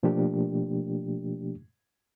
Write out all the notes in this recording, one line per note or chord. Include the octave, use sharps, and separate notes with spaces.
B2 F3 A3 A#3 D4 G4